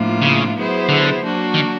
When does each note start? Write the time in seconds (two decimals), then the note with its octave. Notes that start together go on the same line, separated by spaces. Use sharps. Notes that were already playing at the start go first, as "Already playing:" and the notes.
Already playing: A2 F3 A#3 D4 F4
0.22 C#3
0.55 F#3 B3 E4 G#4 C5
0.89 D3
1.22 F#3 A#3 D4 F#4
1.54 D#3